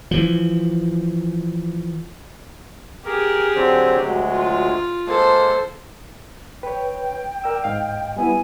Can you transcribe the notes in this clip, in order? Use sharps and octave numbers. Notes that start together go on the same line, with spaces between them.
E3 F3
G4 G#4 A#4
D3 F#3 C4
D2 F#3 G#3
F4
G#3 A#3 A4 C5
B4 C#5 G5
A#4 D5 E6
G#2 D#5 F5
G3 B3 E4 G#5